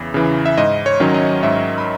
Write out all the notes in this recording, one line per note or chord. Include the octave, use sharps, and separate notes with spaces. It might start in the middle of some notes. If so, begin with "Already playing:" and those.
Already playing: E2 C#3 E3
C#3 E3
E5
G#2 D#5
C#5
D#3 F#3 C#4 C#5
D#5
G#2 E5
B5